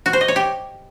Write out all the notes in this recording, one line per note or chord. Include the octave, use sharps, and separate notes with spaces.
F#4
C5
D#5
C#5
G4